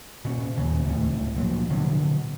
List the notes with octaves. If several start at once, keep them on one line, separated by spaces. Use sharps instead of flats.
A#2 C#4
D#2 C#3
C#2 A2
A#2 F3 F#3
B2 D3 F#3 B3